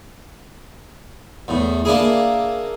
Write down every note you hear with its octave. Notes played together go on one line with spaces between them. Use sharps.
E2 A2
A#3 D4 E4 G#4